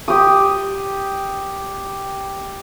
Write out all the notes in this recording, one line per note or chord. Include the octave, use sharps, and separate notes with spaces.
G4 D#6